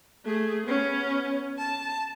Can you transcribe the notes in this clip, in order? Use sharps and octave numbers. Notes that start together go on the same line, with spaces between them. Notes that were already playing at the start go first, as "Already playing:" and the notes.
A3 G#4
B3 C#4
A5